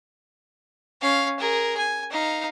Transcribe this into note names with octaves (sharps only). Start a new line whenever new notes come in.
C#4 F5
G#4 A#4
G#5
D#4 F5